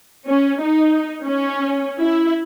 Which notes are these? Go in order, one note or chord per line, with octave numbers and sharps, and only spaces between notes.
C#4
D#4
C#4
E4